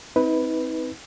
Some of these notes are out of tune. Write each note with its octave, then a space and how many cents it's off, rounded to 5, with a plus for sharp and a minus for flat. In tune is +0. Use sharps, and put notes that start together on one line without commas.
C4 +0 D#4 +40 B4 +0